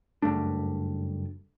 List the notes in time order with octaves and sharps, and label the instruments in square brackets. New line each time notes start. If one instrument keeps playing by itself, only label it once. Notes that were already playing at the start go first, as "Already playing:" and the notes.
[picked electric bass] F#1 G2 A3 D4